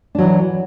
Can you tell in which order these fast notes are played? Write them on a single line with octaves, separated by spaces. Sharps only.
D4 F#3 E3